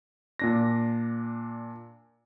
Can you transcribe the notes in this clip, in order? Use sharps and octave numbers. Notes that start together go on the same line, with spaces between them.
A#2 D4 A#6